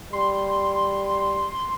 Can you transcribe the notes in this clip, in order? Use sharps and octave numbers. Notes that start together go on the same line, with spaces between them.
G3 C6